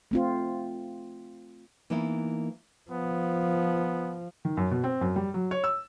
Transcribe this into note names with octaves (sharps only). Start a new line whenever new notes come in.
A3 C4 F4
E3 A#3 B3 D#4 E4
F3 B3
D#3
F#2
B2
C4
F#2
G3
F#3
C#5
E6